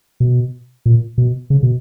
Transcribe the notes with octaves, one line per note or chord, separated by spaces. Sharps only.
B2
A#2
B2
C#3
B2